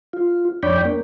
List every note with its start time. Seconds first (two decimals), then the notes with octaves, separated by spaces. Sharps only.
0.13 F4
0.63 F2 D4 C#5 D5 G5 B5
0.85 A#3